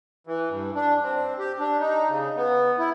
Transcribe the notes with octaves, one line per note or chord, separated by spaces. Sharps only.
E3
G2
D4
C4
G4
D4
D#4
C#3
B3
E4